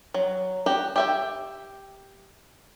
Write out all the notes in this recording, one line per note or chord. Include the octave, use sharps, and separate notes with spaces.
F#3
F#4 G4
G4 E5 G5